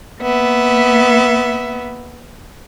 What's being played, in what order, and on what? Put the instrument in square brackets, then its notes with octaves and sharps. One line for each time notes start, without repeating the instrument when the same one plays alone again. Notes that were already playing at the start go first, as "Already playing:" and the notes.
[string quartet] A#3 B3 E5